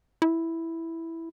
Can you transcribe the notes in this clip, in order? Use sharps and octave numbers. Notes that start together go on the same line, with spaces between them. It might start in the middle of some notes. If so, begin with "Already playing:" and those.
E4